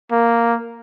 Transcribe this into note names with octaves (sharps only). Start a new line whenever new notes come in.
A#3